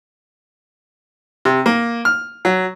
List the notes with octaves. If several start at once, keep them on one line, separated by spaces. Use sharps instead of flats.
C3
A#3
F6
F#3